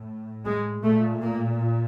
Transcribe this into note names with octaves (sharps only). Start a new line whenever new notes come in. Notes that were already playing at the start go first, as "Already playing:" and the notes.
Already playing: A2
G#3
A#2 A3
A#3